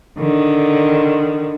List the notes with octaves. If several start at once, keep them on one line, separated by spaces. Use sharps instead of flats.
D3 D#3